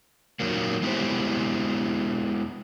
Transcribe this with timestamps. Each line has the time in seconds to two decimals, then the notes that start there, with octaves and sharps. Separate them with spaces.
0.40 A#2 D#3 F#3 A#3
0.82 G#3 B3 E4 G4 C5